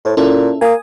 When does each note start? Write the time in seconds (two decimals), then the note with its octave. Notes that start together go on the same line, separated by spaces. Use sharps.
0.05 A2 C5
0.17 A#2 C#4 E4 A4
0.61 A#3 G#5 D#6